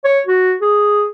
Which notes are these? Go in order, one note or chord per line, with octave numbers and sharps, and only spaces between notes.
C#5
F#4
G#4